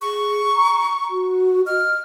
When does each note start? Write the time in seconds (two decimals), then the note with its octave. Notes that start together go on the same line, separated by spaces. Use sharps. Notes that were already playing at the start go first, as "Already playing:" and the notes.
0.02 G#4 C#6
0.54 A#5
1.10 F#4
1.67 D#5 F6